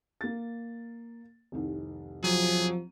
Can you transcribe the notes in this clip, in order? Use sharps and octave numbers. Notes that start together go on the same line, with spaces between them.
A#3 A6
F1 C2 D#3
F3 F#3 G#4 D#7